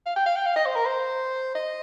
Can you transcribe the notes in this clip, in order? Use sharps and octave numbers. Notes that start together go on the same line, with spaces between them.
F5
G5
F5
G5
F5
D#5
C5
A#4
C5
D#5